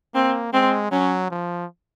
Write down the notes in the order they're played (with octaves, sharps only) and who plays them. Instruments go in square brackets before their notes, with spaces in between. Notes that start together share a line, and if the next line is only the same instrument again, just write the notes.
[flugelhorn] A#3 [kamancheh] C4
[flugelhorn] G#3 [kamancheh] C4
[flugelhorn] F#3 [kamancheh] C#4
[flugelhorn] F3